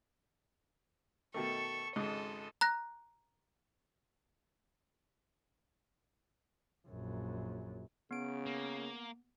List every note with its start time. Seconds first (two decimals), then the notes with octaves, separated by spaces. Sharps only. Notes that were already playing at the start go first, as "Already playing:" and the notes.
1.34 B2 D#3 A3 A4 C#6
1.96 G#1 G#2 C#3 A4 D#5
2.61 A#5 F#6 A#6
6.88 A#1 F#2
8.11 C#3 B3 D7
8.46 A#3